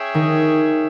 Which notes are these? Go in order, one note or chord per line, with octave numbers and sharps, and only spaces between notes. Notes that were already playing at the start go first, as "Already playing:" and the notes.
Already playing: C#4 G#4 C#5 E5 G5
D#3 D#4